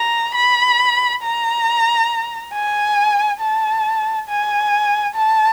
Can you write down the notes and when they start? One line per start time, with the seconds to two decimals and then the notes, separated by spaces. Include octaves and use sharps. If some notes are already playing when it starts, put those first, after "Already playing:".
Already playing: A#5
0.35 B5
1.23 A#5
2.53 G#5
3.40 A5
4.28 G#5
5.16 A5